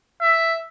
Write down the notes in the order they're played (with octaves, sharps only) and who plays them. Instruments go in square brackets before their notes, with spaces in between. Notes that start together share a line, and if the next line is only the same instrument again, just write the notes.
[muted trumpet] E5